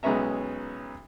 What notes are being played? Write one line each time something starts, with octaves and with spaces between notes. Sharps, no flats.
B1 G#3 B3 C#4 E5 A#5